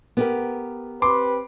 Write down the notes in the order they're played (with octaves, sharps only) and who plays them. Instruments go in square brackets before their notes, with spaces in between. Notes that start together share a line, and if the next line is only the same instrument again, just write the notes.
[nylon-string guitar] B3 G4 A#4
[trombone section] C4 G4 B4 [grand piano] C6 D6